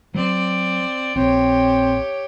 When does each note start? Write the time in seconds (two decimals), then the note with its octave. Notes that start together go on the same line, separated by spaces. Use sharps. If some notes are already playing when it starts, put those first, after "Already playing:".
0.15 F#3 C4 D5
1.15 A#1 C4 G4 C#5